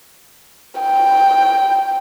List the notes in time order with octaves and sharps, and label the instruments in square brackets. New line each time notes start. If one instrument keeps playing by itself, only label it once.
[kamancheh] G5